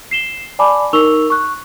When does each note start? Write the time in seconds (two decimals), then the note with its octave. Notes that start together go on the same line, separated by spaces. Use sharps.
0.11 C7 E7 G7
0.59 D5 G#5 A5 B5 D6
0.93 D#4 A#4 C#6 E6 F7 G7
1.30 C#6 F#6